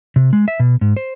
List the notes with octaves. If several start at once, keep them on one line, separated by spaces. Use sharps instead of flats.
C3
G#3
E5
B2
G#2
C5